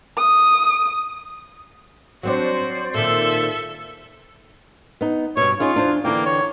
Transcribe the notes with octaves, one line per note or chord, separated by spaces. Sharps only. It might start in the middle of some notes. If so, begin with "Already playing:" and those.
D#6
F#3 C4 D4 F#4 C5 D5
A#2 D#3 A4 E5
B3 D#4
G2 B2 C#5
C#4 D#4 F4 G#4
E2 D4 C5
D3 E3 A#3 G5
C#5